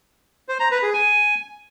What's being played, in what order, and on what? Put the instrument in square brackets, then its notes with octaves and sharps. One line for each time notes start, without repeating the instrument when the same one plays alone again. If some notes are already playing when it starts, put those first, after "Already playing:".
[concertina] C5
A#5
B4
G#4
G#5